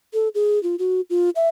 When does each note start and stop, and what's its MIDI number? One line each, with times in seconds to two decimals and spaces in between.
0.14 0.28 69
0.35 0.61 68
0.63 0.76 65
0.79 1.01 66
1.10 1.30 65
1.36 1.49 76